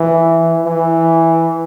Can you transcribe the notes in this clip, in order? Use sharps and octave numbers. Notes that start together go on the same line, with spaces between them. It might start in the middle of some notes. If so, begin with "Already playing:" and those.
Already playing: E3
E3